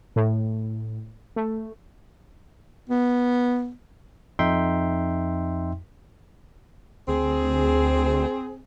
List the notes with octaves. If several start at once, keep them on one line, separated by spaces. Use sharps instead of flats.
A2
A3
B3
F2 D#4 E5 G5 C6
D2 C4 G#4